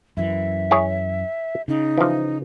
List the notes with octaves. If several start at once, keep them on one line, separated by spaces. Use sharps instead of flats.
F#2 E3 E5
E4 G#4 C#5
C#3 D#4
E3 F3